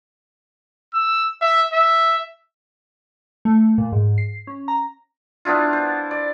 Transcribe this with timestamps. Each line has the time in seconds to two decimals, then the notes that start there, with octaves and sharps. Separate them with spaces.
0.94 E6
1.41 E5
1.73 E5
3.45 A3
3.78 A#2
3.92 G#2
4.18 C7
4.47 C#4
4.68 A#5
5.45 B3 D4 E4 F4
5.73 C5
6.11 D5